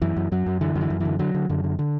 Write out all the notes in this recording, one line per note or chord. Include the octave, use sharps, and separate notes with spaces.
F#2 E3
F#2
F#2 F#3
F#2
D3 E3
F#2
E3
F#2
D3 E3
D3 F#3
D3
F#2 D3
D3
D3